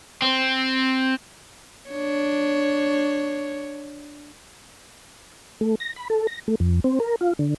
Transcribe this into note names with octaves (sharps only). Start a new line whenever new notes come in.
C4
D4 C#5
A3
A#6
B5
A4
A#6
A3
F2
C4
A#4
F4
D3